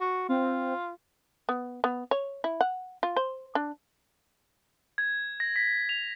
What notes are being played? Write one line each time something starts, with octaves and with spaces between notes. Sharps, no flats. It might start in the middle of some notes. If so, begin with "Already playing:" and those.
F#4
C4 F4
B3
B3
C#5
E4
F#5
F4
C5
D4
G#6
A#6
B6
F7